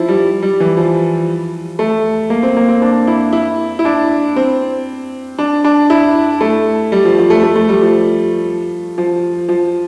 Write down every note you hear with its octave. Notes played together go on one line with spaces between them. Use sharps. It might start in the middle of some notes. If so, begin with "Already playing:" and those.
Already playing: F3 E4
G3
G3
E3
F3
A3
A#3
C4
A#3
C4
D4
E4
E4
E4
D4
C4
D4
D4
E4
A3
G3
F3
F3
A3
A3
A3
G3
F3
F3
F3